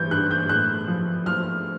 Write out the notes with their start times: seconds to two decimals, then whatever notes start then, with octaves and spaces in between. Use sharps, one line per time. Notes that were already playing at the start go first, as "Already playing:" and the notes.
Already playing: G2 E3 G6
0.11 G2 F#6
0.31 G6
0.49 A2 F#6
0.88 F3
1.26 F3 F6